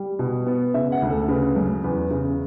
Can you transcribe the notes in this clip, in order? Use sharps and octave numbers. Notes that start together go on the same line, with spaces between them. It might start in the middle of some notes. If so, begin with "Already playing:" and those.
Already playing: G3
B2
B3
C#3 E5
F#5
D2
A4
C#3 B4
F#2
E2 B4
C#3